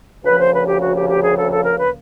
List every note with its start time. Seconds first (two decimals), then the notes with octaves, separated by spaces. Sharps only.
0.24 D2 C#3 F3 A#3 B4
0.38 C5
0.53 B4
0.66 G4
0.80 F#4
0.94 G4
1.08 G4
1.21 G#4
1.35 A4
1.50 A4
1.63 A#4
1.77 B4